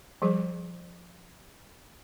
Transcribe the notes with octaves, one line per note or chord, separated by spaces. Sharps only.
F3 G3 G#4